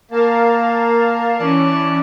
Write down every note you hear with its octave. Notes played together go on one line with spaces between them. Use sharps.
A#3 A#4 F5 A5
E3 C#4 D5 A5